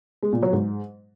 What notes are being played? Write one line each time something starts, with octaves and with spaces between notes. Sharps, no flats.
G#3
A#2
F#3
G#2